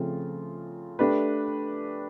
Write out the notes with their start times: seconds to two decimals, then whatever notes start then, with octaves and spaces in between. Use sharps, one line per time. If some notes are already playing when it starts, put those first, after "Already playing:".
Already playing: C#3 F3 A3 C4 F4
0.99 A3 D4 G4 B4